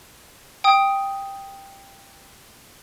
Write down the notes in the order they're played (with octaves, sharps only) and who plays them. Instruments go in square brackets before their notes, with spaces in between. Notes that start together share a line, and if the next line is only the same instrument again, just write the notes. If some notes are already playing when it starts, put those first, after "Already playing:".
[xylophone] G5 D#6